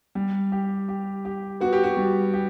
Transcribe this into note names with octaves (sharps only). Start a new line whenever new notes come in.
G3
G4
G4
G4
B3 F#4
G4
F#4
G3
G4